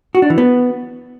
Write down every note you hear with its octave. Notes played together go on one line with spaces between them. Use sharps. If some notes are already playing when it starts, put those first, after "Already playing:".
F#4
D4
E3
B3